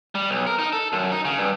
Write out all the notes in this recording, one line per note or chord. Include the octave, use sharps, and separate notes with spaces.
G3
B1
A#4
D#4
A4
F#2
D#4
C#3
G2